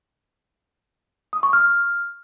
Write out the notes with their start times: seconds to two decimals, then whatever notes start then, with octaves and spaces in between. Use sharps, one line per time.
1.33 D#6
1.43 C#6
1.53 F6